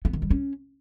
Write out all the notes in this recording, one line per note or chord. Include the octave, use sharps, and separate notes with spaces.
B3
D#3
G3
C#4